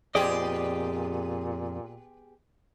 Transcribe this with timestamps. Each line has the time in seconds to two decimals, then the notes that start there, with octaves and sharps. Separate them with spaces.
0.15 F2 A#2 B3 G4 G#4 D5 D#5